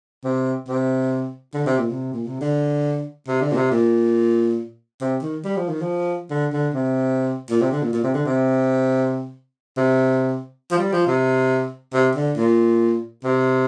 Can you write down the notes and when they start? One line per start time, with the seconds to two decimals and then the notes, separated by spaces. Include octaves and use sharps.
0.24 C3
0.68 C3
1.54 D3
1.66 C3
1.79 A#2
1.91 C3
2.13 A#2
2.27 C3
2.41 D3
3.28 C3
3.42 D3
3.52 A#2
3.56 C3
3.71 A#2
5.01 C3
5.22 D#3
5.45 G3
5.57 F3
5.69 D#3
5.82 F3
6.30 D3
6.53 D3
6.74 C3
7.50 A#2
7.61 C3
7.72 D3
7.82 A#2
7.93 A#2
8.04 C3
8.14 D3
8.25 C3
9.77 C3
10.71 F3
10.78 G3
10.93 F3
11.07 C3
11.94 C3
12.15 D3
12.37 A#2
13.24 C3